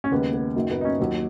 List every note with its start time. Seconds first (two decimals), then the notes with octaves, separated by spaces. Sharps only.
0.04 C#4
0.11 D#2 C#3 G#3 B3
0.34 B3
0.56 F#1 F#2 D#3 F#3
0.71 B3
0.81 D#4
0.85 C#4
1.00 D#2 D#3 F#3